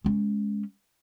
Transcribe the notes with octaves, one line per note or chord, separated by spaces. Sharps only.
G#3 C#4